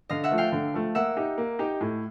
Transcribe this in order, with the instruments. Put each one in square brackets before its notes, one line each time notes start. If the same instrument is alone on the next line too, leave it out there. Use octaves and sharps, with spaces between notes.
[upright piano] D3 [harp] D#5 F5
[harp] E5 F#5
[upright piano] F3 A3
[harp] F5 G5
[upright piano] D3
F3 A3
[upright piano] A#3 [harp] E5 F#5
[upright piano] D#4 G4
A#3
D#4 G4
A2